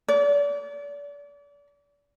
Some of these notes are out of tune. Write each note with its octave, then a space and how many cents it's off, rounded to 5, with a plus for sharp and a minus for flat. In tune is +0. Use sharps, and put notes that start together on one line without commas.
D5 -35